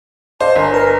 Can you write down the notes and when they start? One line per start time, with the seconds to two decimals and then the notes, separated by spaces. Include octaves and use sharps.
0.40 C5 D5 D#5 F5 A5
0.56 G1 A#4 G#5
0.74 B4 G#5